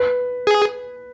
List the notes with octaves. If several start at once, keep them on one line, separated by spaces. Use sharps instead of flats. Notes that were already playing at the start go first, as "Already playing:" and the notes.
Already playing: B4
G#4